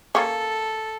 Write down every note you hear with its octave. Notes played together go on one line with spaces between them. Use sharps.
A#3 C#4 A4